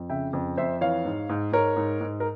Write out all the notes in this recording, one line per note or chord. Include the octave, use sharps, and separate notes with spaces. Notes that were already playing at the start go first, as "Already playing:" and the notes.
Already playing: F2
C#3 E5 G5
F2
F2 C5 E5
E3 C#5 F5
G#2
G#2
G#2 A#4 C#5
G#2
G#2
A#4